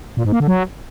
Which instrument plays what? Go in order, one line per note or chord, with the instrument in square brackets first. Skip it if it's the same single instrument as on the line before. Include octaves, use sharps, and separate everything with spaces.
[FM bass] A#2
G#2
A#3
D3
F#3